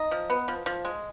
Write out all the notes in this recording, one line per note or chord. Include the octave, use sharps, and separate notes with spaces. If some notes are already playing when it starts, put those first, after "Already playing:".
Already playing: D#4 D#5
F3
B3
F3
F3
G#3